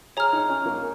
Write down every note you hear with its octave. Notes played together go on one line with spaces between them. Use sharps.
G#4 C#5 A#5 F6
D#4
C#4
A#3